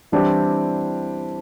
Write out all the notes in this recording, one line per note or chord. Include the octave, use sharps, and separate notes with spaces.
E3 G3 C4 D4 E4 G4